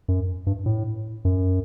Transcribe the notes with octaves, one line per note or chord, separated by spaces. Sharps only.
F#2
G2
A2
F#2